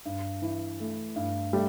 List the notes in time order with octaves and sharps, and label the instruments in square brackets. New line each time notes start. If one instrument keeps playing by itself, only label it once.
[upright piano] G2
E3
A3
G2
[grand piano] G3 [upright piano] A3